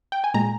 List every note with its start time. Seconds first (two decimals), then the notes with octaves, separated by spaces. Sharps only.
0.12 G5
0.24 G#5
0.34 A#2 G#3 A#5